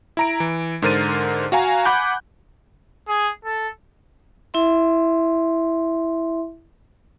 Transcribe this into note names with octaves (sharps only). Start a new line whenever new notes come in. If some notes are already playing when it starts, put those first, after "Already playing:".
E4 A#5 D7
E3
G#2 D3 A#4 C5 A6 D#7
F#4 F5 G#5 A#5
F#5 G#5 B5 D6 F#6 G6
G#4
A4
E4 E5 C6